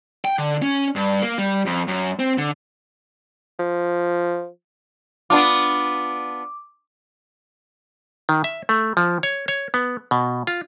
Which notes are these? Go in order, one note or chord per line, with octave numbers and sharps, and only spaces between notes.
G5
D3
C#4
G2
A#3
G3
F2
F#2
C4
D3
F3
B3 D4 F4 D6
D#3
E5
A3
F3
C#5
C#5
B3
B2
F4